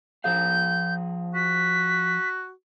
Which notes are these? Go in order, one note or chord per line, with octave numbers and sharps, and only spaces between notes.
F3 G#4 F5 G6
F#4 B6